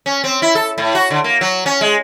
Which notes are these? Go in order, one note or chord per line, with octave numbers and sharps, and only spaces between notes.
C#4
C4
E4
A4
A2
F#4
D3
A#3
F#3
C#4
G#3